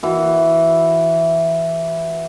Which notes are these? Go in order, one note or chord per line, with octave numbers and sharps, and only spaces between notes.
E3 F#4